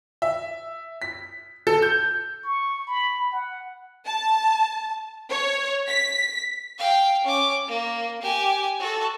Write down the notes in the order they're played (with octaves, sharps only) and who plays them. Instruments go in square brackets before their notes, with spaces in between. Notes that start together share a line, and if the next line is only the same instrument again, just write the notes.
[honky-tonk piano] E5
B6
A4
G6
[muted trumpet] C#6
B5
F#5
[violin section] A5
C#5
B6
[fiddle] F5 G5
C#4 D6
A#3
G4 G#5
F#4 A4